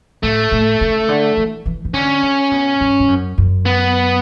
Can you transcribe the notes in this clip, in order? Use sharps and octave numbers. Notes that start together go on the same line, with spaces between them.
A2 A3
A2
C#3
D3
E3
E3
E3
D3 C#4
C#3
B2
G2
G2
F#2
F#2
B3